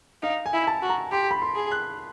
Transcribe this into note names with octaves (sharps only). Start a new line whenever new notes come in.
D#4 F5
G#5
E4
A5
F#4
A#5
G4 C6
B5
C6
G#4
F#6